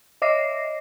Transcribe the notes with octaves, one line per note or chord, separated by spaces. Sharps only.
C#5 D#5 E5 D6 A#6 C7